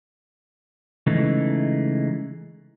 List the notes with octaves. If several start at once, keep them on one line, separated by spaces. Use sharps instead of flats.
C#3 E3 G#3 A3 D#4